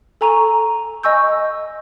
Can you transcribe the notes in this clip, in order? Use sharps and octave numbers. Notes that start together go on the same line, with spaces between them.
A4 G#5 A#5 C#6 D#7
D#5 G#5 C#6 E6 G6